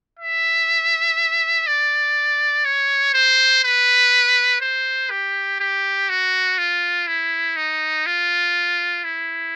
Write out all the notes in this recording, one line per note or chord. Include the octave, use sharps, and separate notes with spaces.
E5
D5
C#5
C5
B4
C5
G4
G4
F#4
F4
E4
D#4
F4
E4